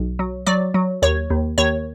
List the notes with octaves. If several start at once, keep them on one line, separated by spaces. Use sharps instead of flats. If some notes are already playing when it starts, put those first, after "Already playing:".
Already playing: B1
F#3
F#3 D5
F#3
D#2 C#5
D#2
D#2 C#5